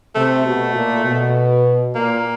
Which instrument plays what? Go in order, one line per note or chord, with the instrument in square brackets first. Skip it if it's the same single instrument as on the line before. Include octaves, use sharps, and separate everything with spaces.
[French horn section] C3 [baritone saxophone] A3
[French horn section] B2
A#2
B2
[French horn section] A#2 [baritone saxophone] A#3